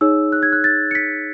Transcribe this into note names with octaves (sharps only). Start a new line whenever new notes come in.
D#4 G#4 C#5 E6
F#6
G#6
F#6
A6
C#7
B6